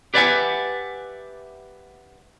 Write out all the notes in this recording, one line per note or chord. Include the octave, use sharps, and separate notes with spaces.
G4 B4 D5 E5 F#5 G#5